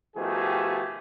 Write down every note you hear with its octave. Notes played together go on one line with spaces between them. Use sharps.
B2 D#3 F3 A3 G4 G#4